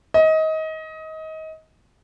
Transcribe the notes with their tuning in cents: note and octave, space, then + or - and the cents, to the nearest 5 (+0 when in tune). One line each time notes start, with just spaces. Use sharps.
D#5 +25